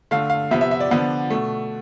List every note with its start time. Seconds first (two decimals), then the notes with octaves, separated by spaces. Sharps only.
0.11 D3 A3 F5
0.30 F5
0.51 C3 F3 B3 E5
0.61 E5
0.71 E5
0.80 D5
0.91 D3 F3 B3
1.30 B2 A3